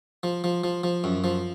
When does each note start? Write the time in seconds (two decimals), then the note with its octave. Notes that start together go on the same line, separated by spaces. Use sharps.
0.23 F3
0.44 F3
0.64 F3
0.84 F3
1.04 F#2
1.24 F3